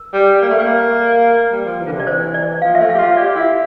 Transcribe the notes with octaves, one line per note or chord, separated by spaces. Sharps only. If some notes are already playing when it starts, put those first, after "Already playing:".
Already playing: A#4
G3
A#3
A3
A#3
G3
F3
E3
D3
C3
D5
E3 C5
D5
F3 F5
E5
A3
G4 F5
F4
F5
G4 D5
E4